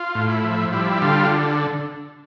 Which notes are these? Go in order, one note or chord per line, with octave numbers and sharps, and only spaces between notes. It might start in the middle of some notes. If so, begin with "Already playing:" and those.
Already playing: F4
A2
E4
F3
G3 E4
D3 F4